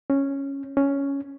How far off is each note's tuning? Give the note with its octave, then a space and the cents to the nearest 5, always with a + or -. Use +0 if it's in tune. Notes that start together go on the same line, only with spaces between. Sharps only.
C#4 -5
C#4 +5